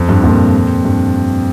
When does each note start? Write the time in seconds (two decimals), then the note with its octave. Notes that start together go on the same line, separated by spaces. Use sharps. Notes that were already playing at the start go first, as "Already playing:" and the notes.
Already playing: F2
0.09 G2
0.24 F2 A#2
0.85 G2